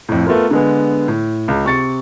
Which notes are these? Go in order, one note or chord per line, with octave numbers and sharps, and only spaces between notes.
F2 A2
A3 B3 F4 A#4
D3 G#3 B3
A2
C#2
C3 C#6 A6 C#7